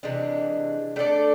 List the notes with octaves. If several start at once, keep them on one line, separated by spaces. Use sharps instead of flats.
C3 E3 G#3 D4
A3 D4 A4 D5